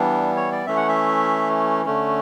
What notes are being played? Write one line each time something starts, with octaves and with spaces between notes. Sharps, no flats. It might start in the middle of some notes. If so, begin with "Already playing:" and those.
Already playing: E3 G3 B3 D4
C#5
D5
E3 A3 C#4 E5
F#5
E5
D3 A3 C#4